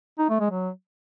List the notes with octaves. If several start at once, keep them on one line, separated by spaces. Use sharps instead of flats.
D#4
A3
G#3
F#3